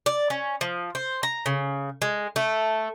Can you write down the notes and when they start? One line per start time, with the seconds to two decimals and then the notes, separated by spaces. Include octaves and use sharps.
0.06 D5
0.30 C#4
0.61 F3
0.95 C5
1.23 A#5
1.46 C#3
2.02 G#3
2.36 A3